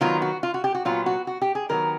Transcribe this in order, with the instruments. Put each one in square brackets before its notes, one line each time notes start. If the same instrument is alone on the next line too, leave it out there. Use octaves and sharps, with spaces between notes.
[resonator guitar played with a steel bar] D#3 F#3 B3 F4
F#4
F4
F#4
G4
F#4
A#2 F#3 B3 F4
F#4
F#4
G4
G#4
D#3 F#3 B3 A#4